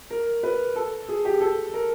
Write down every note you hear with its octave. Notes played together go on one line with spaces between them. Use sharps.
A#4
B4
A4
G#4
G4
A4
A#4